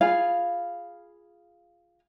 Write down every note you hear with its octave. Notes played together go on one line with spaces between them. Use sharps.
F4 G#4 F5 B5